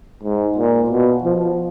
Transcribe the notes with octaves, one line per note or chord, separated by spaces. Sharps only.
G#2
A#2
B2
F3